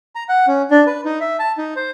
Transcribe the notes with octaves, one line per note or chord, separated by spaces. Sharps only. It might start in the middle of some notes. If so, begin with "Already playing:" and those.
A#5
F#5
C#4
D4
B4
D#4
E5
A5
D#4
C5